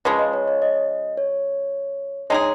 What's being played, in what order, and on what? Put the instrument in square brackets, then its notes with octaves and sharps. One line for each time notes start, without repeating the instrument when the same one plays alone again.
[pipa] C#3 F3 G#3 [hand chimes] B4
[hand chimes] D#5
C#5
C#5
D#5
C#5
[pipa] G#3 D#4 G#4 [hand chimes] C#5